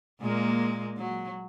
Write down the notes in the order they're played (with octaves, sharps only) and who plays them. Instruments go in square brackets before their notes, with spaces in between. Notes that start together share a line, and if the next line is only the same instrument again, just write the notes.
[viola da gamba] A#2 G#3 A#3
F#3